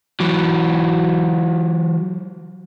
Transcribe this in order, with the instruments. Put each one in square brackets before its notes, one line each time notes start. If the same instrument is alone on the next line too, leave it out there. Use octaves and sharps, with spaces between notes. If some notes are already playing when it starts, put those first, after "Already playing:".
[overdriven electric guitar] E3 F#3